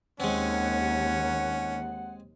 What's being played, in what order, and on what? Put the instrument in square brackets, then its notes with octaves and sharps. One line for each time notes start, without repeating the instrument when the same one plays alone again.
[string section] D#2 [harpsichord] G#3 C4 [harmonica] C#4 [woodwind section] F#5